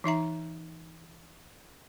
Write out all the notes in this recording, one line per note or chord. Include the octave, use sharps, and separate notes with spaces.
E3 D#4 E5 A#5